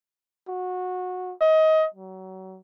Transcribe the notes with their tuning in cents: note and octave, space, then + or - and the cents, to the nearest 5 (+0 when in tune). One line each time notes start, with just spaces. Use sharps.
F#4 -20
D#5 +25
F#3 +30